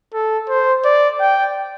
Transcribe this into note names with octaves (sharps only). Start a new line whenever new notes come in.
A4
C5
D5
G5